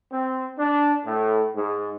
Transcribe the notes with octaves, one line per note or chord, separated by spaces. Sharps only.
C4
D4
A2
G#2